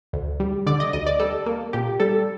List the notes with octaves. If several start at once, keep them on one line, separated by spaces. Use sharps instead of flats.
D2
G3
D3 D5
D#5
D2 D#5
D5
G3 A4
A#3
A#2 G4
G3 A4